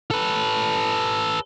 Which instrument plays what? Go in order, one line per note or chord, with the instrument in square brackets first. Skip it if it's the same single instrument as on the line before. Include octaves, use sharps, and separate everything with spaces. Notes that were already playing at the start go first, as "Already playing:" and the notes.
[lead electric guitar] A4 B4